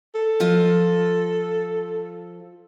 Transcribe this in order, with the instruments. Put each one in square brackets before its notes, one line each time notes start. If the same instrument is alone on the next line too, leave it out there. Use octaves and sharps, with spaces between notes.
[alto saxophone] A4
[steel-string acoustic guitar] F3 F4 D#5